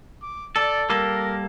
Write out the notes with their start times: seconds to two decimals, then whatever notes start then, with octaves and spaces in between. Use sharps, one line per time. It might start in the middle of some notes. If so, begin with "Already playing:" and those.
0.22 D6
0.56 A4 D5
0.90 G3 A#3 A4 A#4